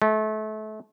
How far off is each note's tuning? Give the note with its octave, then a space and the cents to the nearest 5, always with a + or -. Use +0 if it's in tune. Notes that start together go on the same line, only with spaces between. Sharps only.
A3 -30